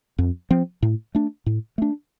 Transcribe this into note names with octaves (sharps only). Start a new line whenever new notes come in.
F2
F3 C4
A2
A3 D4
A2
A3 D4